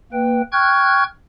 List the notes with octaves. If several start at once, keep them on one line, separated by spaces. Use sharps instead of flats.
A#3 B4 G5
G5 C#6 F6 F#6 G#6